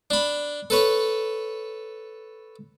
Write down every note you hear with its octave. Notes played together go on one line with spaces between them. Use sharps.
D4 B5
A4 B4 C#5